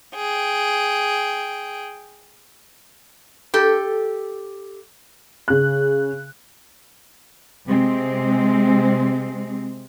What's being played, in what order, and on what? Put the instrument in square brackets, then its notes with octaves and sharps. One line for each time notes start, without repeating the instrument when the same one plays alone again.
[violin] G#4 G5
[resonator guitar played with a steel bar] G4 A4
[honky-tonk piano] C#3 F#6
[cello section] C3 G#3 C4